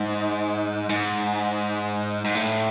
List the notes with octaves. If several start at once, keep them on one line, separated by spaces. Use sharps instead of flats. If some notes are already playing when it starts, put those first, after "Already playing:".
Already playing: G#2
G#2
G#2
A2